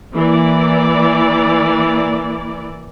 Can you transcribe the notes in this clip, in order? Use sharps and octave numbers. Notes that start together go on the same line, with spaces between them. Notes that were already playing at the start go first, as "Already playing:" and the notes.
E3 A#3 D5